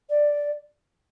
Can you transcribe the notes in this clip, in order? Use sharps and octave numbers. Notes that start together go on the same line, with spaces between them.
D5